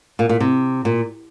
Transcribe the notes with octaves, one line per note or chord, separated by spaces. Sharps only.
A#2
A#2
C3
A#2